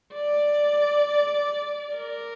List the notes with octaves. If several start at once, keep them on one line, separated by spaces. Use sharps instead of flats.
D5
A#4